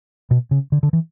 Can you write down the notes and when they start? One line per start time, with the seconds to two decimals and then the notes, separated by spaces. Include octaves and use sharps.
0.31 B2
0.51 C#3
0.72 D3
0.83 D3
0.93 E3